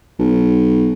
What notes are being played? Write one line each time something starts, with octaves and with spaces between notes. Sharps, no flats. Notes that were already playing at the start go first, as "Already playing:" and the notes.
B1